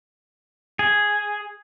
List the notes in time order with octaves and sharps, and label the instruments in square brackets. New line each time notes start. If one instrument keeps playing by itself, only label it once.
[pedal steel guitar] G#4